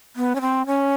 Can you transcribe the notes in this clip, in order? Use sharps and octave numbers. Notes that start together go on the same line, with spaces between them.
B3
C#4
C4
C#4